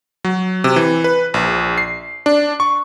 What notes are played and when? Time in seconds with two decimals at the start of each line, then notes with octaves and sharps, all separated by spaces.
0.24 F#3
0.64 C3
0.76 E3
1.04 B4
1.34 A#1
1.78 C7
2.26 D4
2.60 C#6